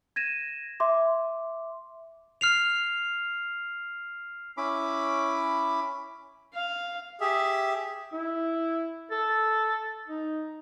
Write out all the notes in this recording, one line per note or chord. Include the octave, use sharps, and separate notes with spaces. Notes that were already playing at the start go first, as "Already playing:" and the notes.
G#6 A#6 D#7 E7
E5 C6 D6
F6 C7 F7
C#4 E4 B5 D6
F5
G4 G#4 E5
E4
A4
D#4